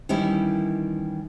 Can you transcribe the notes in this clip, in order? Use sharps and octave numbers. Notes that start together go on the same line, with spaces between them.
D#3 E3 G3 C#4 E4